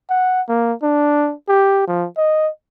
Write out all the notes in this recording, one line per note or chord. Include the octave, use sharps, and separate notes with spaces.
F#5
A#3
D4
G4
F3
D#5